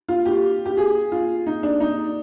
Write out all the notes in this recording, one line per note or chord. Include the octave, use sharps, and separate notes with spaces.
F4
G4
G4
G#4
F4
D#4
D4
D#4